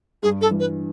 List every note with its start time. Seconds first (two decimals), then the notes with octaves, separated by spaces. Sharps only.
0.23 G2 G#4
0.41 A4
0.51 E3
0.60 B4